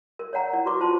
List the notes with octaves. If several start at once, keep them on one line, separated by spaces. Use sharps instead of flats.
A#4
C#5 D5 F#5 A#5
E4 D5
F#4 B4 C#6 D6
F4 C5 A5 C6